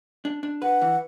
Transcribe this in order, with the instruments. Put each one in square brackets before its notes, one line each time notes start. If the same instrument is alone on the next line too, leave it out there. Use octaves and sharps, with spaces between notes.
[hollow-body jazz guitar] D4
D4
[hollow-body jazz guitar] B4 [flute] F#5
[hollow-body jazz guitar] E3